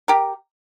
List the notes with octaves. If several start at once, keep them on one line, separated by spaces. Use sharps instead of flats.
G4 A#4